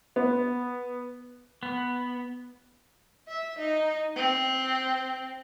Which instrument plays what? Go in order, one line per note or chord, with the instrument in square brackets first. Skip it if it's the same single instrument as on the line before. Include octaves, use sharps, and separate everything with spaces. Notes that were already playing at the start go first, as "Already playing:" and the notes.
[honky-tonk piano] B3
[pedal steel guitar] B3
[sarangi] E5
D#4
C4